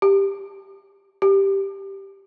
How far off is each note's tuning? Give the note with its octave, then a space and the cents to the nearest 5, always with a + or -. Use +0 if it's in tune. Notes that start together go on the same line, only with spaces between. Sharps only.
G4 +10
G4 +0